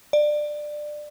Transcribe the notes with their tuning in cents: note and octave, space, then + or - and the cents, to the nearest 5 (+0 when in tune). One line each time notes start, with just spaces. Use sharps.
D5 +20